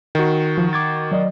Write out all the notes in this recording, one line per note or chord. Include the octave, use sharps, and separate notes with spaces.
D#3 F#4
F3
D6 G#6 A6
F#3 D5 D#5